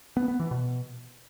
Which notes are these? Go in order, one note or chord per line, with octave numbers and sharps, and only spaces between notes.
B3
B3
E3
B2